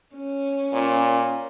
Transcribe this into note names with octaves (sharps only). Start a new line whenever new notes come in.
C#4
A#2